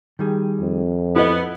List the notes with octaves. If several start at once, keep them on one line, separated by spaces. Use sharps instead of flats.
D#3 G3 G#4
F2
B3 E4 A4 D#5